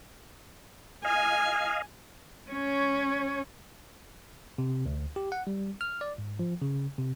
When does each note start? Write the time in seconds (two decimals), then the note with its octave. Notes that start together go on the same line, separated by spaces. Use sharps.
1.05 D#5 F5 G#5
2.51 C#4 C#5
4.58 C3
4.86 D2
5.16 G4
5.32 F#5
5.47 G3
5.81 F6
6.01 D5
6.18 G#2
6.39 F3
6.62 C#3
6.98 C3